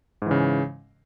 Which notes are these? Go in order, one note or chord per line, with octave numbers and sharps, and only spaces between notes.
G#2 C#3 E3